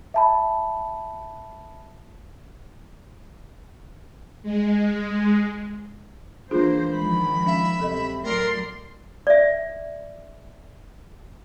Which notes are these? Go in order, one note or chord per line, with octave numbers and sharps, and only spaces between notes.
E5 A5 B5
G#3
E3 A#3 D4 F4 G#4 C5
D#3 F3 G#3 B5
C#4 E5 F5
D2 C3 F#3 A4 D#5
A2 F#3 A3 A#4 D5 C6
D5 E5